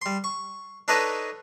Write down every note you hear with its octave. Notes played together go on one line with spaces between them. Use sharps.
G3 C6
C#6
D4 D#4 A4 B4 C#5 D#5